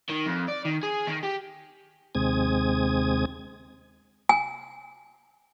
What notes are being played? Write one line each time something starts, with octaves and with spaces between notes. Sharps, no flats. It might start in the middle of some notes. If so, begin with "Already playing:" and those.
D#3
F2
D5
D#3
G#4
D#3
G4
D#2 C3 G#3 C4 D#6 G#6
G#5